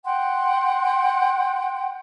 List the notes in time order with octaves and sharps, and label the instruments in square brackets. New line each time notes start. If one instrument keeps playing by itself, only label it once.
[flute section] F#5 G5 C6